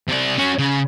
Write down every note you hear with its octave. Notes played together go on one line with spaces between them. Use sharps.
C3 D5
C#4 F#4
C#3